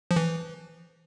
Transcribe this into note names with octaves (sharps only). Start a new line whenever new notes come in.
F3
E3